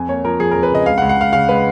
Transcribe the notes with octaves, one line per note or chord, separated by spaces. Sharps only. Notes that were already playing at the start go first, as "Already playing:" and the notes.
Already playing: F2 G#5
A#3 C#5
F3 A#4
F3 G#4
F2 A#4
B4
C#3 D#5
C#2 F5
F#5
C#2
F#5
C#2 F5
C#3 F5
G#3 B4